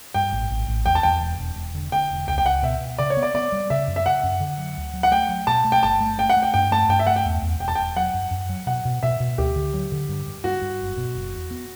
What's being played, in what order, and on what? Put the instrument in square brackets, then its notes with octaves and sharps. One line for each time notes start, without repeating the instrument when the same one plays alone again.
[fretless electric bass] G2 [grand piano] G5
[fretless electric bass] A1
A1
A1
[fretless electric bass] E2 [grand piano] G5
[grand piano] A5
[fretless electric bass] E2 [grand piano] G5
[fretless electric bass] E1
E1
E1
D3
[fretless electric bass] D3 [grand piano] G5
[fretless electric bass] E1
[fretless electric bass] C#2 [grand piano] G5
[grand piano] G5
[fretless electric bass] C#2 [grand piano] F#5
[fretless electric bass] B2 [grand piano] E5
[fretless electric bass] B2
[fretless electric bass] C#3 [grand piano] D5
[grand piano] C#5
[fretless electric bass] B3
[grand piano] D5
[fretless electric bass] B3 [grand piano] D5
[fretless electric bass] G3
[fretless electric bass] C#3 [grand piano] E5
[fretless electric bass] F#2
[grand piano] E5
[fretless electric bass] C#3 [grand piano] F#5
[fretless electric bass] F#2
D3
F#3
D2
F#3
[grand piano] F#5
[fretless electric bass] A3 [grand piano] G5
[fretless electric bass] F#3
[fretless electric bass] B2 [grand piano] A5
[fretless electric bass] A3
[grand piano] G5
[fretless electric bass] G1 [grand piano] A5
[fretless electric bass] A3
[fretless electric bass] A3 [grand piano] G5
[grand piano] F#5
[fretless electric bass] A3
[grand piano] G5
[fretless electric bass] G2 [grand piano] G5
[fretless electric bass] A3 [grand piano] A5
[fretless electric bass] G2 [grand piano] G5
[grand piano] E5
[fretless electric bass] A3 [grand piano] F#5
[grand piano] G5
[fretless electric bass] E2
E2
[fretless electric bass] E1 [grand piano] G5
[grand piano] A5
[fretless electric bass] E1 [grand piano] G5
[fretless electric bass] F#3 [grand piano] F#5
[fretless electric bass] F#2
F#2
F#3
[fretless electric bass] B2 [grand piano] F#5
[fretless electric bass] B2
[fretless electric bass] B2 [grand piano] E5
[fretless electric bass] B2
[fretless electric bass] D2 [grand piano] G4
[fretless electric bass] D3
F#3
D3
G2
G2
[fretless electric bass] G2 [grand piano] F#4
[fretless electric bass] G2
F#1
B2
F#1
E2
B3